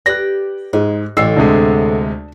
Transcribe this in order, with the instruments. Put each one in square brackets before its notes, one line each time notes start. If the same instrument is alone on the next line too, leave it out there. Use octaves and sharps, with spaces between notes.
[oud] G4 B4 D5 [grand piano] F#6 A#6
[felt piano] G#2 [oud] G#3
[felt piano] A1 E6 C7 [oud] E2 A2 D3
[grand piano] D2 C3 G#3 [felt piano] D4